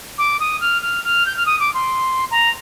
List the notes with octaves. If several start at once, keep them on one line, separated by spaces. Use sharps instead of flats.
D6
D#6
F6
F6
F6
G6
F6
D#6
D6
C6
A#5